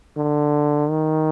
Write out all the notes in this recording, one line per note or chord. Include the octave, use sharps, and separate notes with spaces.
D3
D#3